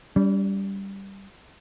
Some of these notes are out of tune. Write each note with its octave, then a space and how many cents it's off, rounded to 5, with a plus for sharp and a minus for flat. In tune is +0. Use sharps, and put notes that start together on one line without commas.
G3 +0 D4 -45